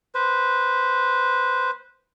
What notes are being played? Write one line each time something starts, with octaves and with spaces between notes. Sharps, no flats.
B4 C5